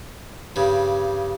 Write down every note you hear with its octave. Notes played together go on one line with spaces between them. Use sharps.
G2 C#3 G3